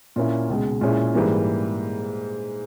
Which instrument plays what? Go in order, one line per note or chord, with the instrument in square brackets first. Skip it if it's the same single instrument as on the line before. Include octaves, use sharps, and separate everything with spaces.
[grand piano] A#2 A#3 C#4 E4
C#2 B2 G#3
A#2 G#3 C#4 E4
G#2 E3 G3 A#3